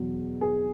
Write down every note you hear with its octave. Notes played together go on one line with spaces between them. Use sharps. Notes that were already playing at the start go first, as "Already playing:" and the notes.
Already playing: E2 B2 F#3
G#4